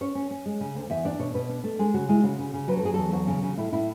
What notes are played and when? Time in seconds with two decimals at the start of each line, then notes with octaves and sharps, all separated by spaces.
0.01 C#4 C#5
0.15 C#4
0.31 C#4
0.46 G#3
0.60 C#3
0.75 D2
0.90 E2 E5
1.05 D4 D5
1.19 B2 C#5
1.34 B2 B4
1.49 D4
1.64 A3
1.79 G#3 G#4
1.94 C#3 F#4
2.09 G#3 E4
2.24 C#3 F#4
2.39 C#3
2.54 C#3
2.68 F#3 B4
2.77 A4
2.83 F#3 G#4
2.94 E2 A4
3.13 F#3 F#4
3.28 C#3
3.43 C#3
3.58 A2 E4
3.72 A2 E4